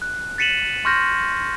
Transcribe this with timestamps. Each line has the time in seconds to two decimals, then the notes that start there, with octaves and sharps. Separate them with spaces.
0.02 F#6
0.38 A6 B6 C#7 D#7 E7 F#7
0.85 C6 C#6 F6 G6 A#6